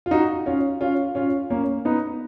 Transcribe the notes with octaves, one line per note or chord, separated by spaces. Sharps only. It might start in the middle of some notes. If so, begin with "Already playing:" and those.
F4
D#4 F#4
C#4 F4
C#4 F4
C#4 F4
A#3 C#4
B3 D#4